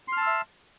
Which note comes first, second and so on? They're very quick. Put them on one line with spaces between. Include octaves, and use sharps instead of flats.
C6 F6 A5 E6 E5